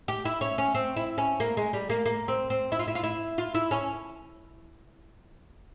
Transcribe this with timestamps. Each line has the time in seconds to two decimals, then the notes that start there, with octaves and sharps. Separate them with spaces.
0.08 G4
0.25 E4
0.41 C#4
0.58 C#4
0.75 C4
0.96 E4
1.18 C#4
1.40 A#3
1.57 G#3
1.73 G3
1.90 A#3
2.06 A#3
2.28 C4
2.50 C4
2.72 E4
2.79 F4
2.88 E4
2.95 F4
3.04 E4
3.38 F4
3.55 E4
3.71 C#4